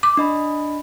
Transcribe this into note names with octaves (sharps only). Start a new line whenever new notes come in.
D6
D4 D#5 B5